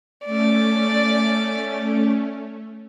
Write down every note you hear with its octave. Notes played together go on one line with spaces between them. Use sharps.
A3 C#4 D5